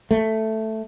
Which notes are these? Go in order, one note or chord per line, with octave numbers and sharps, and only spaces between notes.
A3